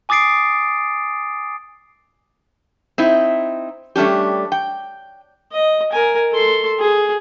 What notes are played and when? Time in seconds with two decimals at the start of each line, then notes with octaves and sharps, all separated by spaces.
0.09 G#5 D6 D#6 A6 C7 D7
2.98 C4 D#4 E4
3.96 G3 A3 C#4 D4 G4
4.52 G5
5.52 D#5
5.92 A#4 G#5
6.32 A4 C6
6.79 G#4